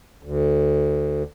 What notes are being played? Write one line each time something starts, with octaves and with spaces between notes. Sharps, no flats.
D2